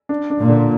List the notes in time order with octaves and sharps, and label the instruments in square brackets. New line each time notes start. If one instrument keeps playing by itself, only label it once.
[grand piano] D4
D4
[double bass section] A#2
[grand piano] D3